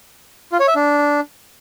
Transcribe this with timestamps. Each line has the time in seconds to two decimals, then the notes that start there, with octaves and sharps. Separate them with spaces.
0.52 F4
0.60 C#5
0.68 E5
0.75 D4